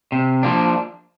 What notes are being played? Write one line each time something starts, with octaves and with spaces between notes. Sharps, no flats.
C3
F3 A#3 D4